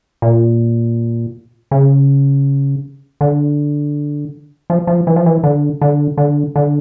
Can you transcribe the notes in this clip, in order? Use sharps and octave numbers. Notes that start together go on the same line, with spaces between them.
A#2
C#3
D3
F3
F3
E3
F3
E3
D3
D3
D3
D3